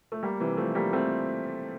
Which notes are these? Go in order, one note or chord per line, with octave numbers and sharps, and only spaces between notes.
A3
G3 A#3
C3 E3
F3 A3
G3 A#3
A3 C4